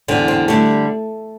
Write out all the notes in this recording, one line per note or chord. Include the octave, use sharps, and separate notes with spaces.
E2 D3 G3 C4
C4
D3 G3 A3